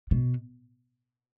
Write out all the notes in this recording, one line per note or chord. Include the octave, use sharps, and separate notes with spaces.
B2